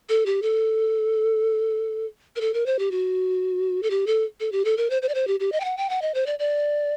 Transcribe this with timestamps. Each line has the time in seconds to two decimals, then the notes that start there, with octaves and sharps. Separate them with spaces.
0.09 A4
0.26 G4
0.42 A4
2.36 A#4
2.41 A4
2.54 A#4
2.66 C5
2.79 G4
2.91 F#4
3.83 A4
3.90 G4
4.07 A4
4.40 A4
4.52 G4
4.65 A4
4.77 A#4
4.90 C5
5.02 C5
5.09 D5
5.15 C5
5.27 G4
5.40 G4
5.52 D#5
5.60 G5
5.65 F#5
5.77 G5
5.90 F#5
6.02 D#5
6.14 C5
6.26 D5
6.39 D5